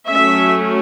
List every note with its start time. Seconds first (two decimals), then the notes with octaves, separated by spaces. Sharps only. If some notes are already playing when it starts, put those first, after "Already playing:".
0.11 F#3 A3 C#4 E5